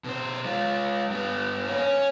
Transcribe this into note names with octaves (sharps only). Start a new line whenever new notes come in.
B2 C5
G#3 F4
G2 B3
A#3 C#4
C#4